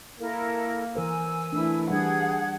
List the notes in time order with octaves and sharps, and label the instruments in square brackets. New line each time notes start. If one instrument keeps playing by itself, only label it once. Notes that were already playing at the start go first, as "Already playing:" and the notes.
[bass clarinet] A#3 [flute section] E4 A4 A#4
[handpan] E3 A#4 C5 [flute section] G#5 E6
[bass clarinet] E3 [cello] A3 E4 [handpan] D4
[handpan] G3 D4 [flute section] G#4 G#6 [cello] F#5